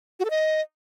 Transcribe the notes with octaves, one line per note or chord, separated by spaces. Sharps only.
F#4
A4
D#5